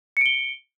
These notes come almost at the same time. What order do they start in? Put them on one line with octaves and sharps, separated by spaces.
C#7 D7 G7